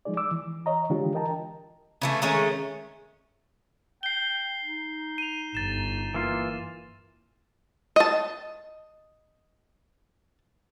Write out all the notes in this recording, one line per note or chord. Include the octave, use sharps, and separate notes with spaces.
F3 G#3 D#4 G#4 D5
D6 E6
E3
C#5 D#5 A#5
D3 E3 G#3 D4 F4 G4
A#4 D#5 G5 A5 A#5
C#3 E3 A3
D#3 G#3 A3 C#4
G5 C7 G7
D#4
D#7 F7
G1 A6 E7
E3 A#3 F4
D#5 A5